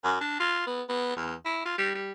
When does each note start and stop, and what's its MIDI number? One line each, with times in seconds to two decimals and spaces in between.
0.04 0.17 42
0.21 0.37 62
0.40 0.63 65
0.67 0.82 59
0.89 1.16 59
1.16 1.34 40
1.45 1.64 64
1.65 1.77 65
1.78 1.91 55
1.95 2.12 55